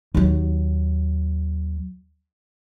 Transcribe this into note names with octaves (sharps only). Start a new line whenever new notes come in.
D#2 F#3